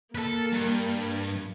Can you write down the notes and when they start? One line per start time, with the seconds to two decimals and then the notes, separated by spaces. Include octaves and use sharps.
0.15 A#3 A4 B4
0.52 G2